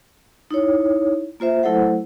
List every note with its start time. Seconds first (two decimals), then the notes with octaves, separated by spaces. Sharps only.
0.51 D#4 E4 C#5
1.40 A#3 F4 C5 E5
1.63 F#3 A3 E4 A4 C5 F#5